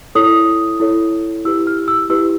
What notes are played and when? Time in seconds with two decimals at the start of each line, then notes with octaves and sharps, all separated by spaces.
0.15 E4 A4 C#5 D#6
0.80 E4 A4 C#5
1.45 E4 G4 B4 E6
1.67 F6
1.88 E6
2.10 E4 G4 B4 E6